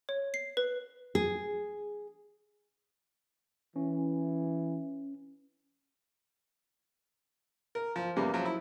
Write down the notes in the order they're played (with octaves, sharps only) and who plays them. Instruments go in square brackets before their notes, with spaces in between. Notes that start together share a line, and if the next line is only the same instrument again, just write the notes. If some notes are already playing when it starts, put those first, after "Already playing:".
[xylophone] C#5
C7
B4
[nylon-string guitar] G#4
[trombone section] E3 [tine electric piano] C#4
[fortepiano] A#4
F3
E2 C#3 G3 A#3 B3
F3 F#3
E4